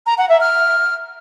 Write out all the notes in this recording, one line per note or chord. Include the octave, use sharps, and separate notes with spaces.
A#5
F#5
E5
F6